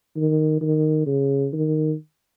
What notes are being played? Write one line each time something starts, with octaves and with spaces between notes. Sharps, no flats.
D#3
D#3
C#3
D#3